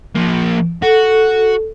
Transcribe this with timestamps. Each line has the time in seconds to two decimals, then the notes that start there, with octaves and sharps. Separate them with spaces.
0.16 F3 A#3
0.82 F#4 A4